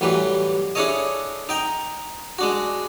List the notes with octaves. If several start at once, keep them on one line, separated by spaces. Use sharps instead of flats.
A1 E3 F#3 G3 B4
D4 E4 G#4 A4 C#5 D#5
D#4 G5 A#5
G#3 D4 F#4